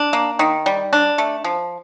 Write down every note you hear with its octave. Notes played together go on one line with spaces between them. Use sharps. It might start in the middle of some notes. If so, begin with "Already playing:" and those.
Already playing: D4
A#3
D#3
G3
D4
A3
F3